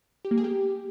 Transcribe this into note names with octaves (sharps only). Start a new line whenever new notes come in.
G4
A#3
G#4
G4